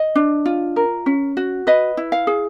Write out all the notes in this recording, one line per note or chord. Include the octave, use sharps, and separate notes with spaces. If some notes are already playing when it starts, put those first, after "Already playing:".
Already playing: D#5
D4
F4
A#4
C#4
F#4
B4 D#5
E4
F5
G#4